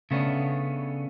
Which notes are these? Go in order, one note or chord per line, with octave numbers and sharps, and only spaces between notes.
C#3 A3 B3 C#4 D4